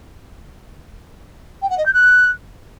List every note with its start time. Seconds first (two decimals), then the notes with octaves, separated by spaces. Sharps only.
1.62 G5
1.70 F#5
1.77 D#5
1.85 G6
1.93 F#6